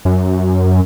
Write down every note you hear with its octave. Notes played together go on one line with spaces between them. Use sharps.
F#2